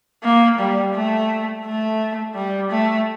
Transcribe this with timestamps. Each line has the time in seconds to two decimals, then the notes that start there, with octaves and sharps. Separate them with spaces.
0.24 A#3
0.59 G3
0.95 A3
1.65 A3
2.35 G3
2.71 A3